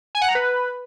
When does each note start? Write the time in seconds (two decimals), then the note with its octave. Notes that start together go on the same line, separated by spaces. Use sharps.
0.15 G#5
0.21 F#5
0.28 A#5
0.35 B4